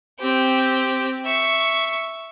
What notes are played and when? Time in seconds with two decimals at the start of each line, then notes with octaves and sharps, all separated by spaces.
0.20 C4 G4
1.25 E5 C#6